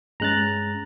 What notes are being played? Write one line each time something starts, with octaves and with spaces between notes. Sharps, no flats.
G2 G#3 C#4 A#5 F#6 A6